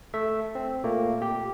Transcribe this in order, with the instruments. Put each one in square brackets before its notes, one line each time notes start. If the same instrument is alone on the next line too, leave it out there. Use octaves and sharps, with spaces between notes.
[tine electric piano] A3 E5
C4
A#2 A3 A#3
G4